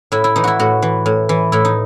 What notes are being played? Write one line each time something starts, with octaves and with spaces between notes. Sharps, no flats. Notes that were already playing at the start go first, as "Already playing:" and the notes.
A2 E4
E4
E3 D#4
E4 F#4
A2 F#4
E3
A2
E3
A2 E4
D#4